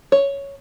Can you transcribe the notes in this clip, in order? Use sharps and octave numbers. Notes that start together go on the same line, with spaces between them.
C#5